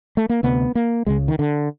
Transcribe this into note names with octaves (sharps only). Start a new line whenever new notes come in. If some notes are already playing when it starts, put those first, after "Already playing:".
A3
A#3
D2 C3 B3
A#3
C#2 C#3 G#3
D#3
D3